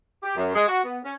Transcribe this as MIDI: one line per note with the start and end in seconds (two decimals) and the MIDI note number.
0.23 0.34 67
0.36 0.51 42
0.54 0.66 56
0.67 0.82 66
0.84 0.98 59
1.04 1.13 61